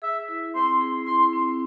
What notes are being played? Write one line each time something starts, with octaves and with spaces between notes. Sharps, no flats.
G#4 E5
E4
C4 C6
G#4
E4 C6
C4